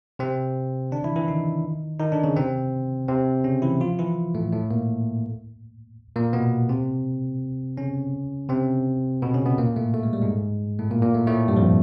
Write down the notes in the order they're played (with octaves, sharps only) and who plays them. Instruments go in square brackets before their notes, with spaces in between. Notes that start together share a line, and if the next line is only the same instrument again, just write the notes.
[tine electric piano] C3 C4
D3 D4
E3 E4
E3 E4
D#3 D#4
D#3 D#4
D3 D4
C#3 C#4
C3 C4
C3 C4
C#3 C#4
E3 E4
F3 F4
E3 E4
A2 A3
A2 A3
A#2 A#3
A#2 A#3
B2 B3
C3 C4
C#3 C#4
C3 C4
B2 B3
C#3 C#4
B2 B3
A#2 A#3
A2 A3
A3
G#3
G3
G#2 G#3
A2 A3
A#2 A#3
A#2 A#3
A2 A3
A2 A3
G2 G3
F2 F3